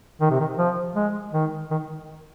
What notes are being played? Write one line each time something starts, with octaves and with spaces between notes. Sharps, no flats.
D#3
C3
D#3
F3
G#3
D#3
D#3